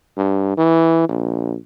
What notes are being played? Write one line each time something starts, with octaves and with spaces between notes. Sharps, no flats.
G2
E3
A#1